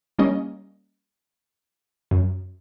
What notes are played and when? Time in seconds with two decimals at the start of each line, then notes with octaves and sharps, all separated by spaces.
0.19 G3 A#3 C#4 D#5
2.11 F#2